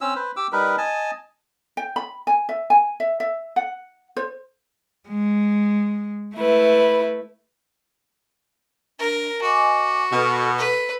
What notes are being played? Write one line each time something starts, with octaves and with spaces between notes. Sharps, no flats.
C4 C#4 E6
B4 C5
G4 D6 E6
G3 D#4 A#4 B4
D#5 G#5 A5
G5
B5
G#5
E5
G#5
E5
E5
F#5
C5
G#3
A3 E4 B4
D4 A#4
F#4 D#5 G#5 D6
B2 A4 F6
A4 B4